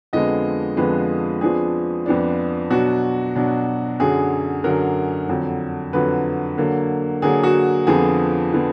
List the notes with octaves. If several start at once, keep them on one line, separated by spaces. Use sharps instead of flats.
F2 D3 F3 G#3 B3 D#5
F2 D3 F3 G#3 B3 B4
F2 F3 B3 D4 G#4
F2 F3 B3 D4
B2 F#3 D4 F#4
B2 F#3 D4
F#2 D3 F#3 G#4
F#2 D3 F#3 A#4
F2 D3 F#3
F2 D3 F#3 B4
D3 F#3 A#3
D3 F#3 A#3 G#4
F#4
F2 D3 F3 B3 G#4
D3 F3 B3